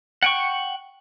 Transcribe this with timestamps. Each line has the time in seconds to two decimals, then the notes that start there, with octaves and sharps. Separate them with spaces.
0.23 F#5 G5 C#6